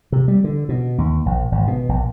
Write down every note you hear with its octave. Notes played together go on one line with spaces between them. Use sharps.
C3
G3
D3
B2
D#2
A#1
G#1
B2
A#1